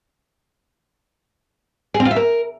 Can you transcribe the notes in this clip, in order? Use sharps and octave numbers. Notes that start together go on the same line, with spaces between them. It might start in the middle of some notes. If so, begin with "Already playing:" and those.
G#4
C4
F4
E5
A#4